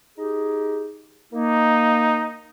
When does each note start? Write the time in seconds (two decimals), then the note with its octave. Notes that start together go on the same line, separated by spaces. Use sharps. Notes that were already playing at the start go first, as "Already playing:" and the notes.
0.18 D#4 G4 G#4
1.33 A#3 D#4